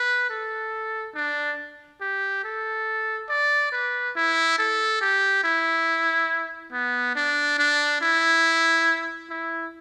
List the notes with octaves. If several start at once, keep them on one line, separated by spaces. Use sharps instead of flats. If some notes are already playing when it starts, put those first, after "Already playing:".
Already playing: B4
A4
D4
G4
A4
D5
B4
E4
A4
G4
E4
B3
D4
D4
E4
E4